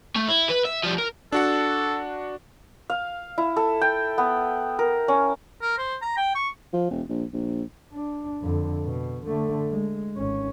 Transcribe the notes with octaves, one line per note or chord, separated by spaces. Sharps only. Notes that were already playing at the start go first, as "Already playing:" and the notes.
A3
E4
B4
E5
F3 G3
A#4
D4 F#4 A4 F#5
F5
E4
A4
G5
B3
A#4
C#4
A#4
C5
A#5
G5
C#6
F3
E1
A#1
A#1
D4
F2 D3
B2
D3 A3
G#3
G#1 C#4